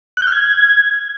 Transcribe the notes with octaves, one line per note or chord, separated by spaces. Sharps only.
F#6
G6
F6
G#6